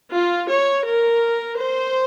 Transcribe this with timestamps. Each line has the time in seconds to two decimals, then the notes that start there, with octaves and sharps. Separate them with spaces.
0.12 F4
0.49 C#5
0.86 A#4
1.59 C5